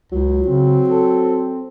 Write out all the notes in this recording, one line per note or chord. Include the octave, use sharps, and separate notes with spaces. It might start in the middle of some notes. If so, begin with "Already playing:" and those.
C#2 F#3
C#3 C4
A4